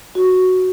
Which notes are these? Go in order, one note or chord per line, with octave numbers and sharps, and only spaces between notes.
F#4